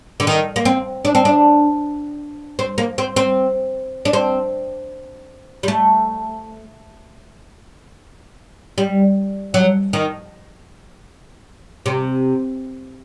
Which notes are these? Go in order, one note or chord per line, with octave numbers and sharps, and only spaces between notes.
D3
D#3
A#3
C4
D4
C4
D4
C4
A#3
C4
C4
D4
C4
G3
A3
G3
F#3
D#3
C3